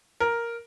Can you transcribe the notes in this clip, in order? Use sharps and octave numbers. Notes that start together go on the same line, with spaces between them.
A#4